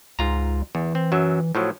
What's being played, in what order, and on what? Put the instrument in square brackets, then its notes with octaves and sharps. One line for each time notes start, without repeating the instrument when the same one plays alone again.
[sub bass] C#2 [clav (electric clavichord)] G#2 F4 A#5
[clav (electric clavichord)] E2 [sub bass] E3
[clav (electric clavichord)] C4
F#2 F#3 E5
A2 F3 F#3